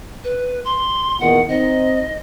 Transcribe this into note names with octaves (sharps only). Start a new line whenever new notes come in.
B4
C6
E2 A#2 D#3 F#5
C4 D#4 D#5